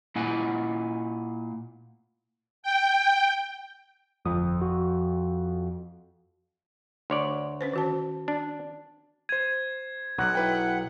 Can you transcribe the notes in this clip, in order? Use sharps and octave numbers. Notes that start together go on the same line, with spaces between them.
A#2 E4 F#5 G#5
G5
G1 F2 F3 D#6
F#4
D2 C#5 D5
C#4 B4 C5
D#3 F#4 A5
D4
C5 G#6 D#7
B1 F#5
E4 B4 G5